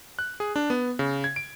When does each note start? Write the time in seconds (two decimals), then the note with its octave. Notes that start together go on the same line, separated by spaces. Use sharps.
0.19 F#6
0.40 G#4
0.56 D4
0.70 B3
0.99 C#3
1.24 G#6
1.36 D7